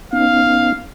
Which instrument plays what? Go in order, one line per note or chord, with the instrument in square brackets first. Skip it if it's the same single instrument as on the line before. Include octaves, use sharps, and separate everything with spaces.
[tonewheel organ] B3 C#4 D#4 [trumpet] F5